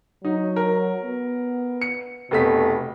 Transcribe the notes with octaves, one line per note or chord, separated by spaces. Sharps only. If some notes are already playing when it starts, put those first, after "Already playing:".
F#3 D#4
A#4
B3
C#7
F1 B2 A3 B6